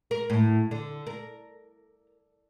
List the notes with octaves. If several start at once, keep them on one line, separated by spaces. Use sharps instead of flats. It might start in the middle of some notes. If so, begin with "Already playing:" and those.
A#4
A2
D3
A#4